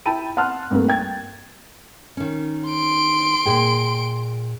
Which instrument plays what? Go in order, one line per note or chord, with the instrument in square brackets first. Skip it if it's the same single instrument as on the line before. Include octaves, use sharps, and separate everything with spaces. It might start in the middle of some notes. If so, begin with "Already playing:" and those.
[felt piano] E4 G5 A5 B5 D#7
F#5 A5 C6 F6 F#6
C2 G2 G3 A3 A#3
G5 G#6 A6
[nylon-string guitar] D#3 C#4
[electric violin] C6 D7
[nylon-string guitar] A#2 G#4 G5